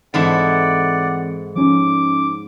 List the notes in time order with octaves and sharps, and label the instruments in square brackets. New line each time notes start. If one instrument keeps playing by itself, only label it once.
[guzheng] G#2 E4 A4 [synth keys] E3 C4 [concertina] D5 F#5
[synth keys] F3 C#4 D#4 [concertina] D6